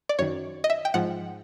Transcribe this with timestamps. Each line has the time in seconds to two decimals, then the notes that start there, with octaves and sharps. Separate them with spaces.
0.09 D5
0.19 F#2 D#3 C#5
0.64 D#5
0.70 E5
0.85 G5
0.94 G#2 F3 F#5